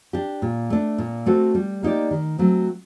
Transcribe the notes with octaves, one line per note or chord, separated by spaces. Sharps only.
D4 G4
A#2
A3 D4
A#2
A3 C4 F#4 A4
G3
A#3 D#4 G4 D5
D#3
F#3 A3 C4